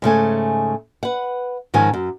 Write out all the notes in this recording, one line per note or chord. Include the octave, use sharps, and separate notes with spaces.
G#2 C#3 A3 G#5
B4 F#5
G#2 D#3 F3 C#4 G#5
F#2